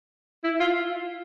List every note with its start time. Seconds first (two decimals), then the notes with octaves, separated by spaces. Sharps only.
0.44 E4
0.60 F4